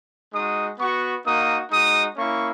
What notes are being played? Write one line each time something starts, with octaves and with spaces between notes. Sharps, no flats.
G#3 D#4 F#4 D#6
B3 F#4 C#6
A#3 D#4 F#4 D#6
G#3 D#4 F#4 D#6
A#3 C#4 E4 C#6